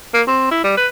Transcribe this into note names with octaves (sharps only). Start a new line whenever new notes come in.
A#3
C4
E4
G3
B4